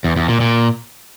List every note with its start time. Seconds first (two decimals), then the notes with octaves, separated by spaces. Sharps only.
0.04 E2
0.16 E2
0.28 A#2
0.40 A#2